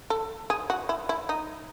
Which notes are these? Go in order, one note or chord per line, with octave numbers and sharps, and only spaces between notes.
A4
G#4
F#4
E4
E4
D#4